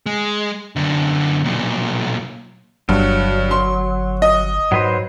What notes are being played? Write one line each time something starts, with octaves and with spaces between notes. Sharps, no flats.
G#3
F#2 D3
B1 A#2
G1 G2 F#3
C6
D#5
G#2 F#3 B4 C5